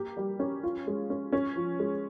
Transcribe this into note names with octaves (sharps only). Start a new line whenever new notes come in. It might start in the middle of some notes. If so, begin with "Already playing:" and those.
Already playing: A#3 G4
G3
C#4
F4
G#3
C#4
C#4
F3
G#3